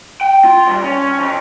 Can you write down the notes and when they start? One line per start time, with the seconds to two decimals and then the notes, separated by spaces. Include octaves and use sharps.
0.21 G5
0.44 F4
0.67 G2
0.84 C#4
1.19 F2